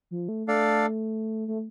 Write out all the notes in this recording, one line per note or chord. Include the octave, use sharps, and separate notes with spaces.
F3
A3
A3 D4 A4 D5 F5
A3